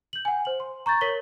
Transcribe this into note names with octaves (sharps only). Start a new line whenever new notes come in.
G6 F#7
F#5 G#5
C5 F#7
C6
A#5 C#6 G6 A6
A#4 C#5 B6 F#7 G7